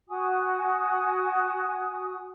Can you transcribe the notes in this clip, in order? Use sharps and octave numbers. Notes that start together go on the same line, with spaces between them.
F#4 G#5 D#6